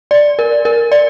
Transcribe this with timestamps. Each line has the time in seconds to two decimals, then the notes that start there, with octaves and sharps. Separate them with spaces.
0.11 D5
0.39 A#4
0.65 A#4
0.92 D5